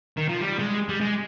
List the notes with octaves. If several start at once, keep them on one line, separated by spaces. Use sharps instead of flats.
D#3
F3
G3
G#3
G3
G#3